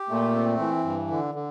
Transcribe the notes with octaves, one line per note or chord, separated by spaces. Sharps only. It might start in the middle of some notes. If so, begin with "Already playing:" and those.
Already playing: G4
A#2 A3
C4
E3
G2
D3
D3